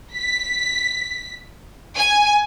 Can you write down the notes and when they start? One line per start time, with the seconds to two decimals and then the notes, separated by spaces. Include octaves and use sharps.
0.15 B6
1.97 G#5